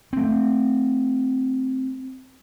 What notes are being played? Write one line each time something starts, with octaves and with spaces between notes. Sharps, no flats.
A3 C4